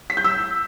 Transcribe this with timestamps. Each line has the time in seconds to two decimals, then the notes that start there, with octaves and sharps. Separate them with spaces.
0.10 B6
0.17 G6
0.24 E6